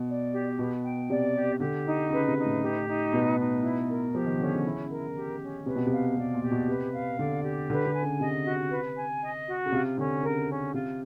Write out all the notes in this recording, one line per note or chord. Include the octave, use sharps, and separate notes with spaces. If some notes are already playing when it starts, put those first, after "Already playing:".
Already playing: B2
D5
G4
B2 B4
G5
C3 D5
G4
D3 G4
D#4
C#3 B4
C3
D#4
A2
G4
D#4
B2 B4
D#4
E4
A#4
F3 G4
D#3
D3 C#4
C#3
E4
A#4
G4
C#4
C3 B4
B2
C3
F5
C3 D5
A#2
G4
B2
C3 B4
F5
D3 D5
G4
D3 B4
D3
G#5
C#3
C3 D#5
F#4
B4
G#5
D#5
F#4
C#3
C3 F4
D3 C#4
C#3 A#4
C#4
C3 F4